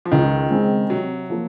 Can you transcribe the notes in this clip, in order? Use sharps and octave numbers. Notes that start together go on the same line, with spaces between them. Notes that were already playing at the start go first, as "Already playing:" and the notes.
F3
C#2 D#3
C#3 G#3 C4
C3 F#3
F3 A#3